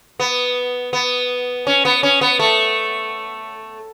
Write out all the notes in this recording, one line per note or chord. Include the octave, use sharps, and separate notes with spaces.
B3
B3
C#4
B3
C#4
B3
A3